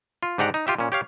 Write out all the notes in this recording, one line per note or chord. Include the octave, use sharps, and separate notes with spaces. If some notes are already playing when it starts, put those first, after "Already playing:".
F4
G#2 D4 G4 F#5 A#5
D#4
F4 G4 E5
A#2 C#4
G4 C#5 F5